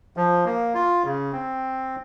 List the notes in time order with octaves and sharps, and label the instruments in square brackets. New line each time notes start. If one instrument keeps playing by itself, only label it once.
[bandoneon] F3
A#3
F4
C#3
C4